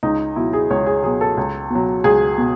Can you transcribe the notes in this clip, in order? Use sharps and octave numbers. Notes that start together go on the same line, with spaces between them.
C#2 D#4
B2 F#3 E4
G#4
C#2 C#5
G#4
B2 F#3 G#4
A4
C#2
B2 F#3
C#2 G#4
B2